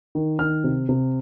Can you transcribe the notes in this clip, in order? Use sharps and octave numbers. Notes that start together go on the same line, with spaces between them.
D#3
D#3 F6
C3
C3